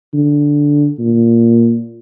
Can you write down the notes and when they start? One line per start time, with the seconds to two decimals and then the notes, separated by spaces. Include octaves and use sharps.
0.13 D3
0.99 A#2